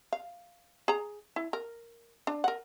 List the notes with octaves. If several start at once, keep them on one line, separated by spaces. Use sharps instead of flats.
F5
G#4 A#5
E4
A#4
D4
A#4 F#5